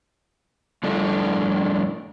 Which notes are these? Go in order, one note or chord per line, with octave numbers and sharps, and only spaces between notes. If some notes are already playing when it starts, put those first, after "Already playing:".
F2 A2 G3 D4 A4